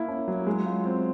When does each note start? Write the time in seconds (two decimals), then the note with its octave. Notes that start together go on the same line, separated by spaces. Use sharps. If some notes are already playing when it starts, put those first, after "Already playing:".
Already playing: A#3 E4
0.08 C#4
0.28 F#3
0.47 G#3
0.66 F4
0.85 C4